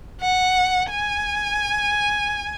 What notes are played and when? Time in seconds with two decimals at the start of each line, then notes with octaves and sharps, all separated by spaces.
0.21 F#5
0.90 G#5